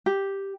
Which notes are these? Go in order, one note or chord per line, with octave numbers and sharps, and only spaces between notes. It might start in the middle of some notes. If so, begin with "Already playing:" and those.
G4